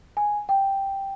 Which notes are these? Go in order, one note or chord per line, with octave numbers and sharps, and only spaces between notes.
G#5
G5